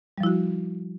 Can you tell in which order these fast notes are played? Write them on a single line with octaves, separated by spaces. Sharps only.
G3 F3 E4 F#4